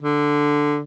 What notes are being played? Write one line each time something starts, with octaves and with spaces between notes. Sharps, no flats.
D3